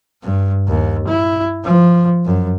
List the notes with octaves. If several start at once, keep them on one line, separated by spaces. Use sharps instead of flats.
G2
D#2
E4
F3
F#2